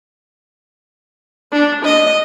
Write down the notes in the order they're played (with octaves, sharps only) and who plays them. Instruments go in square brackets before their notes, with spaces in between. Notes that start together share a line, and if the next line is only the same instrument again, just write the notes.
[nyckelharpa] D4
D#5